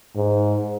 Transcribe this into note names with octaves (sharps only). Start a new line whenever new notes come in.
G#2